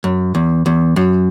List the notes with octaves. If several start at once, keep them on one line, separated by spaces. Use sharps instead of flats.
F#2
E2
E2
F#2